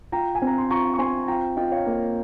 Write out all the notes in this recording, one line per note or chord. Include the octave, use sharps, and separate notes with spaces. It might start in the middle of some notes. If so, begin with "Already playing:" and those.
F4 G5 A#5
G#5
C4
A#5
C6
F4 A#5 C#6
C#6
C4 G#5 C6
F4 G5 A#5
F4 D#5 G5
C#5 F5
A#3